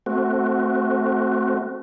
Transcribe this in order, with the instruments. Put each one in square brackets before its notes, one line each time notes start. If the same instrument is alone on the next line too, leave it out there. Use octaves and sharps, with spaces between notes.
[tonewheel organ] A3 C4 F#4